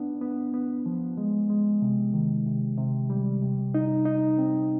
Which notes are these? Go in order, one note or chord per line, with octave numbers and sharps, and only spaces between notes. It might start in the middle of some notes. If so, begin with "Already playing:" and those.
Already playing: B3 D4
B3
B3
F3
G#3
G#3
C3
D#3
C3
C3
G3
C3
D#4
D#4
C4